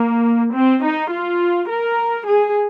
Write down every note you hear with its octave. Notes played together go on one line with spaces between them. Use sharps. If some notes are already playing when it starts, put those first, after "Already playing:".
Already playing: A#3
C4
D#4
F4
A#4
G#4